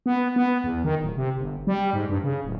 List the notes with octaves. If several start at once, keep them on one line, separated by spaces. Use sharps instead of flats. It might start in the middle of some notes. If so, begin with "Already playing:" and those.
B3
B3
E2
D#3
D1
C3
G1
G3
G#2
G2
C#3
D1